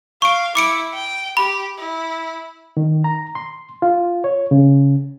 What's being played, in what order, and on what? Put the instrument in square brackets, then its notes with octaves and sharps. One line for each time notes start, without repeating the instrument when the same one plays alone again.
[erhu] F5 [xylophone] C#6 D7
[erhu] E4 [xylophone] D6 C#7 D7
[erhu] G5
[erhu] G4 [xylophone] B5
[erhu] E4
[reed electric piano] D#3
A#5
C6
F4
C#5
C#3